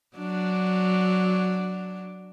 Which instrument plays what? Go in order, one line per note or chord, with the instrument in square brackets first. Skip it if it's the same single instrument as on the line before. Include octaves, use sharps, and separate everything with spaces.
[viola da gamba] F#3 D4